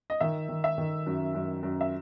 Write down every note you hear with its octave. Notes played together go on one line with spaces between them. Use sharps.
D#5
D#3 E5
D#3
E5
D#3
F#2
F#2
F#2
E5